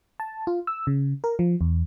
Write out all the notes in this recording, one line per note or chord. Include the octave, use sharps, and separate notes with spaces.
A5
F4
E6
C#3
A#4
F3
E2